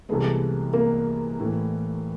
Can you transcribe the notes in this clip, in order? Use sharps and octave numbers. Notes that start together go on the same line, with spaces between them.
C2 C3 E3 G#3 A3 B3
A#3
A2 E3 A3